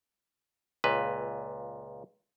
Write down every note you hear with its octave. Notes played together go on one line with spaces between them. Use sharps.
C#2 A#2 B4